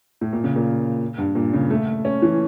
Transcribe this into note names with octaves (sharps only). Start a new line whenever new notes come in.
A2
A#2
C#3
A#2
G2
A#2
C#3
A3
C#4
E3